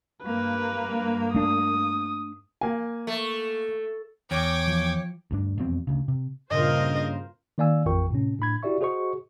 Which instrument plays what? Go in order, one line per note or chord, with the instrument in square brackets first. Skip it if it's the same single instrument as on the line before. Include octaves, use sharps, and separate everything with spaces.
[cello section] G2 A#3 [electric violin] B4
[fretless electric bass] A3 D4 [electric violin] D#6
[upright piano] A#3 G#5
[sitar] A3
[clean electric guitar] E2 [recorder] C#5 [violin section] G5 D6 G#6
[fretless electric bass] F3
[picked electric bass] D2 G2 D4
E1 F2 B2 C4
D2 C#3
C3
[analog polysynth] G2 A#2 C#3 [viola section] F4 A#4 C5 [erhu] D#5
[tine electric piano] D#3 A#3 D5 F5 G#5 E6
A1 F2 F4 A#4 G5 C#6
A2 C3 C#4
A2 D4 B5 G#6
E4 F#4 G4 D5 E5 C#6
F#4 G#4 C5 D#5 C#6